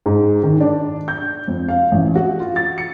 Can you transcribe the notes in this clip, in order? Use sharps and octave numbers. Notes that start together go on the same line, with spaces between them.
G#2
D#3
D4
G6
F2
F5
A1
F#4
F4
A6
C#7